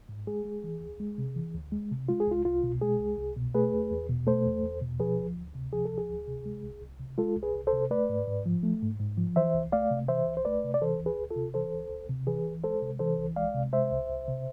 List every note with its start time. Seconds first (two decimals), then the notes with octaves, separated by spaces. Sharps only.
0.09 G#2
0.27 G#3 G#4
0.45 G#3
0.64 E3
0.81 D2
1.00 G#3
1.18 C3
1.36 E3
1.55 D2
1.72 G#3
1.91 C3
2.09 G#3 F4
2.20 G#4
2.27 C2 F4
2.45 C2 F4
2.63 B2
2.81 G#3 G#4
3.00 C2
3.18 C2
3.36 B2
3.55 A3 G#4 B4
3.73 E2
3.91 E2
4.09 B2
4.27 A3 A4 C5
4.45 E2
4.63 E2
4.81 B2
5.00 F3 G#4 B4
5.19 D2
5.36 D2
5.55 C3
5.73 F3 G#4
5.85 A4
5.91 D2
5.98 G#4
6.09 D2
6.28 C3
6.45 G#3
6.63 C2
6.82 C2
7.00 C3
7.18 G#3 F4 A4
7.37 C2
7.43 G#4 B4
7.54 C2
7.67 A4 C5
7.73 C3
7.91 A3 B4 D5
8.09 G#2
8.27 G#2
8.46 F3
8.63 A3
8.82 G#2
9.00 G#2
9.18 F3
9.36 E3 C5 E5
9.55 C2
9.72 A3 D5 F5
9.91 C3
10.08 E3 C5 E5
10.27 C2
10.37 C5
10.45 A3 B4 D5
10.64 C3
10.74 D5
10.82 E3 A4 C5
11.00 D2
11.06 G#4 B4
11.18 D2
11.30 F4 A4
11.36 C3
11.54 E3 A4 C5
11.73 D2
11.90 D2
12.09 C3
12.27 E3 G#4 B4
12.46 C2
12.64 G#3 A4 C5
12.82 C3
12.99 E3 A4 C5
13.18 C2
13.36 G#3 D5 F5
13.55 C3
13.73 G#3 C5 E5
13.91 C2
14.09 C2
14.27 C3